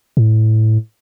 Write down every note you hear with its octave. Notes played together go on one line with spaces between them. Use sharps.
A2